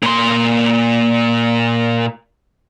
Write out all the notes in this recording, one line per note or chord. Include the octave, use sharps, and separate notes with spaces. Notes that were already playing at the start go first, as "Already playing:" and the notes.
A#2 C6